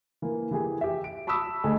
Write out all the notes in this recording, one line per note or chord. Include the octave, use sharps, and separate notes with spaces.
E3 A#3
E3 G4 G#4
G4 E5
D7
A5 B5 C#6 D#6 E6 B6
D2 A3 G#4 D#5